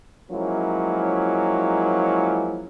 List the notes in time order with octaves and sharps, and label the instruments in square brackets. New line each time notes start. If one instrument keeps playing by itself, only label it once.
[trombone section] F3 F#3 G#3 A#3 C#4 E4